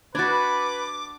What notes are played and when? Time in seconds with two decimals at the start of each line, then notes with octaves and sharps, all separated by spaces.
0.15 D4 F#4 B4 D6 G#6 A6